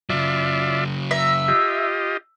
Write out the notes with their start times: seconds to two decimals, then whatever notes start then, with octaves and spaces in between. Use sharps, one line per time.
0.10 C#3 F#3 F4 D5 E5
1.11 E5 A#5
1.48 F4 G4 D#5